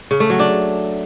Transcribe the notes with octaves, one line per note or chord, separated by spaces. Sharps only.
C#3
A3
F#3
D4